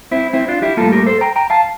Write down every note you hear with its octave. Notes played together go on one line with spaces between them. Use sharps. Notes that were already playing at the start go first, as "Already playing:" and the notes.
C4 E4
C4 E4
D4 F4
E4 G4
A2 G3 A#3 F4 A4
G4 A#4
A4 C5
G5 A#5
G5 A#5
F5 A5